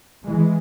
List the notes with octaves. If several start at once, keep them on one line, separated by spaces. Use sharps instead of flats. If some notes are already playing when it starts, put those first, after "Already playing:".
E3 G#3